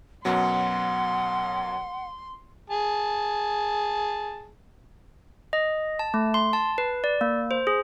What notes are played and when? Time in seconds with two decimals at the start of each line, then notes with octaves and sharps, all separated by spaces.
0.25 F#2 B2 F#3 F#5 C6
2.70 G#4 A5
5.53 D#5
5.99 A5
6.14 A3
6.34 C6
6.53 A5
6.78 B4
7.04 D5
7.21 A#3
7.51 C5
7.67 G#4